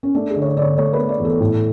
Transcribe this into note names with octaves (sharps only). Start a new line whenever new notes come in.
C#4
A3 D4
G#4
D3
C#5
D5
D3 C#5 D5
A3 C#5
B4
A3
D5
E2
A4
A2